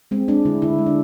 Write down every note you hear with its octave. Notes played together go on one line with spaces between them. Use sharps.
G#3 C4
G#3 D4
D3 E4
D3 E4
G#3
D4